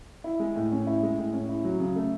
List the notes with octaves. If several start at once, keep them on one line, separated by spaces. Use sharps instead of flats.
E4
G#3
A2
C#4
E4
G#3
A2
C#4
E4
F#3
C#3
A3